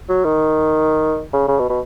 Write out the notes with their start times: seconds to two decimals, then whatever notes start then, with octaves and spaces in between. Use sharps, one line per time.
0.09 F#3
0.25 D#3
1.33 C#3
1.48 C#3
1.59 B2
1.69 B2